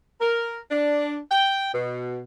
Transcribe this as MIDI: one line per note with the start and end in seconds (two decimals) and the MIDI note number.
0.21 0.58 70
0.71 1.17 62
1.31 1.73 79
1.73 2.21 47